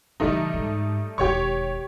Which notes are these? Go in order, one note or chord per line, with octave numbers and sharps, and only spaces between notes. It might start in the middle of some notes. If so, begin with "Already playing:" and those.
C#3 E3 G3 A3 D#4
G#2
E1 D#2 G4 C#5 C#6